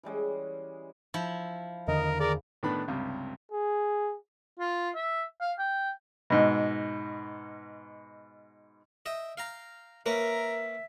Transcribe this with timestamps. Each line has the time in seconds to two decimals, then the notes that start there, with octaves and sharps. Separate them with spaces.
0.03 E3 G3 G#3 C#4
1.14 F3 E4
1.88 E2 D3 D#3 A#4 D#5
2.20 G#4 A#4 D5
2.63 A2 D#3 B3 D4 B5
2.88 C#2 G2 C3
3.52 G#4
4.59 F4
4.95 E5
5.41 F5
5.59 G5
6.30 G#2 B2
9.06 D#5 E5 G5
9.37 F5 G5 A#5
10.06 A#3 C#4 A#4 B4 E5